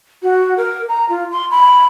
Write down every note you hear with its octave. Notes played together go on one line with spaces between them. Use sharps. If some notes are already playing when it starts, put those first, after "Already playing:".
F#4
A#4
A#5
F4
C6
B5